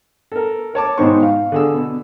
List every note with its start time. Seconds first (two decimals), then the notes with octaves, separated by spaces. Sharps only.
0.32 A4 A#4
0.74 A#4 C#5 A5 D6
0.98 G#2 B2 D#3 D#4 C5 C#6
1.22 F5
1.52 D3 G#4 E6
1.74 B2